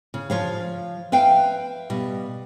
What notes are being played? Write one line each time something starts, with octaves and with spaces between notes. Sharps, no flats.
C#3
F3 C#5 F5
B4 E5 F5 G5
B2 G3